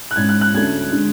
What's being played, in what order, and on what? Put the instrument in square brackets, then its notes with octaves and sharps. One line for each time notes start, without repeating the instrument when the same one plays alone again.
[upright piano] F#6
G#2 G#3 C#4 G#6
F#6
F#6
D2 D3 A3 C#4 G#6
D3 G#3